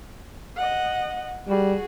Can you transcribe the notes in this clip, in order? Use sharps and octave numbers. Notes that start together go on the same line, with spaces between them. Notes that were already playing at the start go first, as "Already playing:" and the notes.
D#5 F#5
G3 F#4 G#4